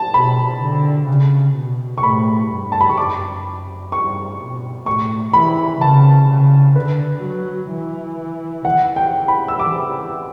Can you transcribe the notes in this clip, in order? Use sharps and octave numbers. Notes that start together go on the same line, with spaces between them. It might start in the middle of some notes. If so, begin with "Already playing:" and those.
Already playing: A5
B2 B5
D3
C#3
B2
C#6
A2 B5
G2
A5
B5
C#6
F#2 D6
G2 C#6
B2
A2 C#6
E3 B5
C#3 A5
C#3
D3 B4
F#3
E3
E3 F#5
G5
B5
E6
E3 D6